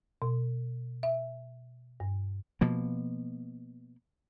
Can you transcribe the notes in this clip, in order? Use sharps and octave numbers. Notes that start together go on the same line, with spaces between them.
B2
E5
G2
B2 F3 A#3